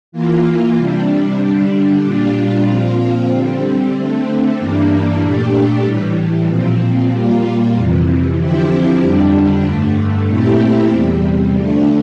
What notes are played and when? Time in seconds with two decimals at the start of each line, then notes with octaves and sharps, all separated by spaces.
0.12 E3 A#3 F4
0.76 C3 G3 D4
1.39 D3 G3 D4
2.03 A#2 G3 D4 F4
2.66 A#2 F3 C4 F4
3.30 D3 G3 C4
3.93 D3 A3 C4
4.57 G2 E3 G3 A#3 D4
5.20 A#2 A3 D4 G4
5.83 A2 E3 G3
6.47 A#2 F3 C4
7.10 A#2 G3 A#3 F4
7.73 F2 C3 E3
8.37 D3 F3 C4 E4 G4
9.00 F2 D3 G3 D4
9.64 G2 D3 A3
10.27 A#2 A3 C4 E4 G4
10.91 E2 C3 G3
11.54 D3 F3 A3 D4